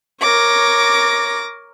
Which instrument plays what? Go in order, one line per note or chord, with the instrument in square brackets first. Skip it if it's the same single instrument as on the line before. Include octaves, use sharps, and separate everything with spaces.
[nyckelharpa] A#4 C#5 [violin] D6 A#6